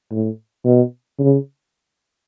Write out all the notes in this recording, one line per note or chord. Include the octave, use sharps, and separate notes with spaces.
A2
B2
C#3